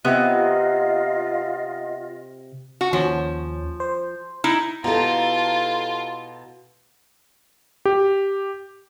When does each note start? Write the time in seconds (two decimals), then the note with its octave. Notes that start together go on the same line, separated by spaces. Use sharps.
0.05 C3 B3 D#4 F4 D#5 E5 F#5 D#6
2.81 F#4
2.93 D#2 F3 C#4
3.80 C5
4.44 D#4 E4
4.84 B2 E4 F4 G4 A4 A#5
7.85 G4